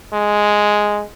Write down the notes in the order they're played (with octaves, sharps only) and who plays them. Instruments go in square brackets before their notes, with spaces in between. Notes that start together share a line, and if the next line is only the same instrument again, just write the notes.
[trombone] G#3